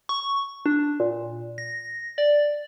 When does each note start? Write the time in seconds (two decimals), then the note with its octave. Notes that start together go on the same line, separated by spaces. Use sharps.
0.09 C#6
0.66 D4
1.00 A#2
1.58 A#6
2.18 D5